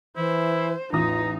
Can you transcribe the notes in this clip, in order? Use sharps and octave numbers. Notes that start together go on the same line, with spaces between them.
E3 E4 C5
A1 E2 D#4 F4 A#5 D#6